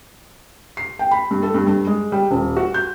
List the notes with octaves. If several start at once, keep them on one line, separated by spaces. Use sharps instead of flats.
C7
G5
B5
G2
A4
G2
G2
G#3
G3
D#1
F#4
G6